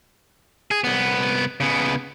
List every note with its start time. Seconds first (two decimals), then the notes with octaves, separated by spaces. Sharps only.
0.71 G#4
0.84 C2 B3
1.60 C#3 B3